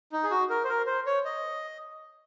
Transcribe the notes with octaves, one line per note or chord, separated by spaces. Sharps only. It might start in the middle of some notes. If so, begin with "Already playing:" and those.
D#4
G#4
F#4
A#4
C5
A#4
C5
C#5
D#5